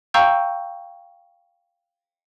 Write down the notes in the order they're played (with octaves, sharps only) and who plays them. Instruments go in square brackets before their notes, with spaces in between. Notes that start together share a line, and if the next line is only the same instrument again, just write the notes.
[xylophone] F5 G5 A#5 C#6 E6 G6